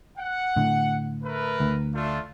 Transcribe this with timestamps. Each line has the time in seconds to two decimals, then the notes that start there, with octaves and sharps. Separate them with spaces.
0.18 F#5
0.56 A2 D3
1.22 A3 A#4 B4
1.60 D2
1.94 A3 D4 F4